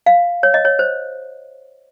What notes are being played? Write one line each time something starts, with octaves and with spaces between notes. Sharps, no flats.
F5
C#5
D#5
C#5
C5